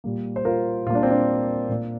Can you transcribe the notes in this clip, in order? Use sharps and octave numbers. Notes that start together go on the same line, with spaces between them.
A#2 G3 A#3
C5
F4 A#4
A#2 G3 A#3 F4
D4
C4
D4
A#2 A#3